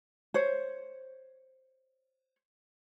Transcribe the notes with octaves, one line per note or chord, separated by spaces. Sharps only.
C5 C#5